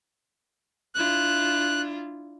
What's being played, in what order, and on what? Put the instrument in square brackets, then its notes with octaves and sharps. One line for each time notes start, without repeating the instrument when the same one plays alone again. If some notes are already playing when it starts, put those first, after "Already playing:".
[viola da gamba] D4 E4 F4 [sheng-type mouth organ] F#6